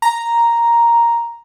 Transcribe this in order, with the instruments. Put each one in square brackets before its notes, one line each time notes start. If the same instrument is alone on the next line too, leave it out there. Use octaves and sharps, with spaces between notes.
[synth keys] A#5